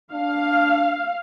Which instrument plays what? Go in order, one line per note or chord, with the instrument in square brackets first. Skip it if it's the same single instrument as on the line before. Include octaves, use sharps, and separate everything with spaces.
[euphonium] D4 [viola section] F5